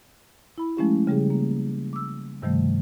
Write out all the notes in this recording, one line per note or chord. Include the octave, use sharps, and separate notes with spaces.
E4 B5
F3 G#3 A3 C#4 E4 G4
C#3 G3 G4 G#4
A#3
D6 E6
G2 C3 D#3 F3 G3 A3